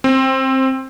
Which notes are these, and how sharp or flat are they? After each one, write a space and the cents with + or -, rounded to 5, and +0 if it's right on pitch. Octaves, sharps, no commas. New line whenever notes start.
C4 +15